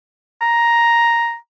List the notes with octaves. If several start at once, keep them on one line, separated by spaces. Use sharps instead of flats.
A#5